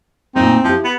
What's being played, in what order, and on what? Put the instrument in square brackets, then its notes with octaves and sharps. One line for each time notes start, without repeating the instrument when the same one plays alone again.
[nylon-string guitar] A#2 A3 [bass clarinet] C4 [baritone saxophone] D#4
[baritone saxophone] F3 [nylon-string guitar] E4 G4
[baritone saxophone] B3